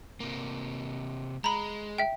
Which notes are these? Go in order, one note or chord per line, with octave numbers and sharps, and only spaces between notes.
C3 A#3
G#3 A#5 B5
E5 G5